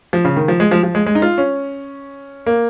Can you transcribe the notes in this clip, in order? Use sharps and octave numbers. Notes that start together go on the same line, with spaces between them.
F3
C#3
D#3
F3
G#3
F3
F3
G#3
G#3
D#4
F4
C#4
A#3